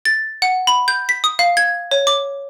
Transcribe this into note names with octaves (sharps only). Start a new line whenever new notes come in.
A6
F#5
B5
G6
B6
D#6
F5
G#6
C#5
D6